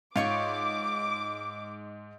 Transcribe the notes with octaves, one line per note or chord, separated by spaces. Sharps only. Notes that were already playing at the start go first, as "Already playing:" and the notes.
G#2 F4 C#5 C#6 D6